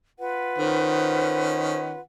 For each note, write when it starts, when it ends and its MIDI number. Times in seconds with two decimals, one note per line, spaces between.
0.19 1.99 65
0.19 1.99 71
0.19 1.99 78
0.58 1.98 51
0.58 1.98 61
0.58 1.80 72